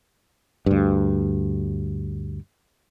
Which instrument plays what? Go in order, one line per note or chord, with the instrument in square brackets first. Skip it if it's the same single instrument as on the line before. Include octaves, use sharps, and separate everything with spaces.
[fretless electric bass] D2 G2